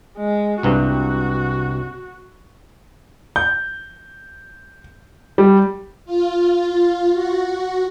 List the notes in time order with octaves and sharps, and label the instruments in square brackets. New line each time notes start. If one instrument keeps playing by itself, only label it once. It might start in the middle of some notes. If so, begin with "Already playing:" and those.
[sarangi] G#3
[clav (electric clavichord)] C2 G2 C3 [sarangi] F#4
[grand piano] G6
G3
[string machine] F4
F#4